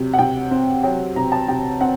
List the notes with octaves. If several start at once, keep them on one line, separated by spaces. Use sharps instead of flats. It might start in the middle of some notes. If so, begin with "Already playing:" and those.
Already playing: C3 F#3
F#5
C3 G5
C4
F#3 G5
C3 A#5
A5
C3 G5
C4 F#5